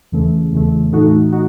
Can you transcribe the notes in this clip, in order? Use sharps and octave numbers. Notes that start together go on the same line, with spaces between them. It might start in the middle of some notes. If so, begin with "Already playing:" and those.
E2 C#3 E3 A3
E2 C#3 E3 A3
A2 E3 A3 D#4 F#4
D#4 F#4